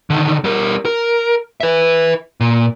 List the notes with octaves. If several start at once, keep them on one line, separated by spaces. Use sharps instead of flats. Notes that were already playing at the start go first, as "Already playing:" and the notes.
D3 D#3
G3 A#4
A#4
B4 E5
A#2